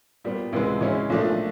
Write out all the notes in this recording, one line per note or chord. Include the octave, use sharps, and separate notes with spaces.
A#2 G3 B3
C#2 C3 E3 G#3
C#3 E3 G#3 C#4 E4
B1 A#2 F3 A3 D4